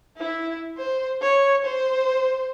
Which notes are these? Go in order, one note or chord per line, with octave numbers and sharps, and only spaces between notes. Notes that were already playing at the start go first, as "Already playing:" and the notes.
E4
C5
C#5
C5